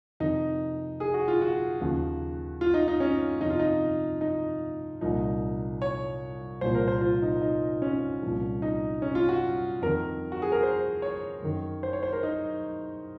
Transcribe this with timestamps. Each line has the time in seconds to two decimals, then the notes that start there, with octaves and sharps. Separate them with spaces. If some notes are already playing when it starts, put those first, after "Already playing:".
0.20 F2 C3 D#3 D#4
1.00 G#4
1.14 F#4
1.28 F4
1.41 F#4
1.80 D#2 C#3 F3
2.61 F4
2.74 D#4
2.88 D#4
3.00 C#4
3.41 F2 C3 F3 D#4
3.50 F4
3.60 D#4
4.21 D#4
5.01 C2 A#2 F3 D#4
5.82 C#5
6.61 C2 A#2 F3 C5
6.75 A#4
6.88 C5
7.01 F4
7.22 D#4
7.42 D#4
7.82 C#4
8.23 C2 A#2 F3
8.62 D#4
9.02 C#4
9.15 F4
9.29 F#4
9.82 F2 D#3 A#4
10.32 F#4
10.42 G#4
10.52 A#4
10.63 C5
11.02 C#5
11.42 F#2 D#3
11.83 C5
11.93 C#5
12.03 C5
12.13 A#4
12.23 D#4